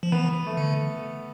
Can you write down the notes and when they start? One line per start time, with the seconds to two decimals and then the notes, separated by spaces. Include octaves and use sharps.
0.03 F3
0.12 E3 B3
0.47 A3
0.57 D3